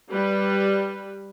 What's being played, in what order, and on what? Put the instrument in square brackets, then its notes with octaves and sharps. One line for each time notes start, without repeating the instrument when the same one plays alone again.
[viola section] G3 B4